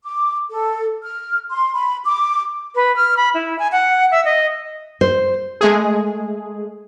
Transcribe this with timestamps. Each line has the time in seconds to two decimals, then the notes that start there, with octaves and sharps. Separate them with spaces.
0.04 D6
0.50 A4
1.03 F6
1.51 C6
1.74 B5
2.05 D6
2.75 B4
2.96 F6
3.17 B5
3.34 E4
3.59 G#5
3.72 F#5
4.11 E5
4.25 D#5
5.01 C5
5.61 G#3 A3 G#4